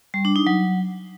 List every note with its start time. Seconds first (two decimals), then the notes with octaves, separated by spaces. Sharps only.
0.14 G3
0.25 D4
0.36 D#4
0.47 F#3